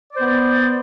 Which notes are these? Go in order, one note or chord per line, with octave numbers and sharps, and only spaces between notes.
B3 C5 D5